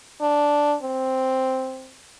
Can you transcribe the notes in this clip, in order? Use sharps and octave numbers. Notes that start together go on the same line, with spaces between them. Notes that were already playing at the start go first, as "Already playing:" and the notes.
D4
C4